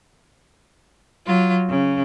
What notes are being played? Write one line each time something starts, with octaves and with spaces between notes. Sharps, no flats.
F#3 F4
C#3